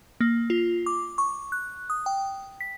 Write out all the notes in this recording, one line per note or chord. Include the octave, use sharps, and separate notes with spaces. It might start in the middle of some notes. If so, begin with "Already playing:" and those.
A#3
F4
D6
C#6
F#6
D#6
G5
B6